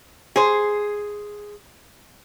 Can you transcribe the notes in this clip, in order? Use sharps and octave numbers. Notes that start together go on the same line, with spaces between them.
G#4 C5